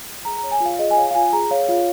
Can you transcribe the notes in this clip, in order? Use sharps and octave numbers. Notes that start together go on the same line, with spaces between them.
G#4 A#5
A#5
C#5
G#5
F4
F5
G#4 D#5
G#5
C#5 F5
F5
F4 G#5
G#4 A#5
C#5 F5
F4 F5